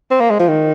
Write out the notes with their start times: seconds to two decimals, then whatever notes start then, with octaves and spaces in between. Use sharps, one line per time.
0.11 C4
0.20 A#3
0.31 G#3
0.39 F3
0.48 D#3